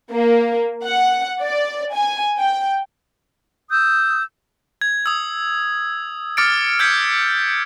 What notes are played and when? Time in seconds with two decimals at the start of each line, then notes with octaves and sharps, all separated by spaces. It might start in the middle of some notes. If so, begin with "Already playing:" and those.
0.12 A#3
0.85 F#5
1.42 D5
1.93 G#5
2.40 G5
3.72 D#6 E6 G6
4.81 G#6
5.06 D#6 E6
6.37 D6 F6 A6 C#7 D7
6.79 E6 F6 G6 G#6 B6 C#7